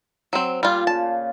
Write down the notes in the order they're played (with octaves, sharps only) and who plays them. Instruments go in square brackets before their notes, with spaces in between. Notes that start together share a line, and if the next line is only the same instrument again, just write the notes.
[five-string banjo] F#3 C4
[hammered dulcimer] A#2 [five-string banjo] G3 F4
[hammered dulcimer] C#3 F4 [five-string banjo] A5